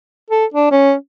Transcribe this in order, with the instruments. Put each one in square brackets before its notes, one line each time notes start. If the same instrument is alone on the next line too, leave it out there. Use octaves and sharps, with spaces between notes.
[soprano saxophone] A4
D4
C#4